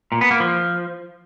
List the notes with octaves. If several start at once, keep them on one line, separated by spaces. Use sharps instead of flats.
A#2
B3
A#3
F3